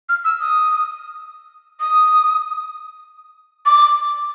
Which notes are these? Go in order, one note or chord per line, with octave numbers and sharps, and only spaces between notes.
F6
E6
D#6
D#6
D6